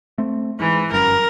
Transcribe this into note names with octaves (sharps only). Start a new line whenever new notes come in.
A3 C4
G#2 E3
G1 F#2 A#4